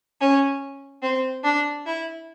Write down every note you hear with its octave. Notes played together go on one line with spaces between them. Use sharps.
C#4
C4
D4
E4